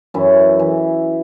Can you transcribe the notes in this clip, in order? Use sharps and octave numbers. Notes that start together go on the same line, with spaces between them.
F#2 E3 E4
E3